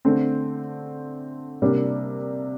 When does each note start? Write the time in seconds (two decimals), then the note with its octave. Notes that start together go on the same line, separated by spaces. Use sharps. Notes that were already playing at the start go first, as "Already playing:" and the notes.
0.05 D3 A3 C4
1.62 C3 G3 A#3 D4